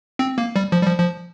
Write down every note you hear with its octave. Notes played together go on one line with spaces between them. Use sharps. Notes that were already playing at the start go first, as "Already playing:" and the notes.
C4
A#3
G3
F3
G3
F3
F3